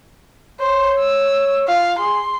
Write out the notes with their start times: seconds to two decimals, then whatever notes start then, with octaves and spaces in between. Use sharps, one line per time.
0.60 C5 C#5
0.99 E6
1.68 F4 F5
1.98 G#4 C6